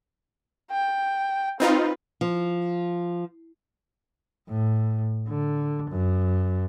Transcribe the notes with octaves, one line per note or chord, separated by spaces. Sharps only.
G5
C4 D#4 F4 B4
F3
A2
D3
F#2